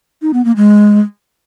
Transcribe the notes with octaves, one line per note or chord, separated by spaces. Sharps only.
D#4
B3
A#3
G#3